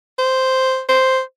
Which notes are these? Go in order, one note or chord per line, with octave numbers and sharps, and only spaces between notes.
C5
C5